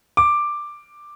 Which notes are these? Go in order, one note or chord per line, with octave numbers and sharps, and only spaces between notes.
D6